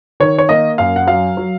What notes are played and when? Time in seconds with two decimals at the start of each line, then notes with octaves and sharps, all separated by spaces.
0.20 D#3 C#5
0.38 C#5
0.49 A#3 D#5
0.78 F#2 F5
0.96 F#5
1.07 F#3 F5
1.37 F#3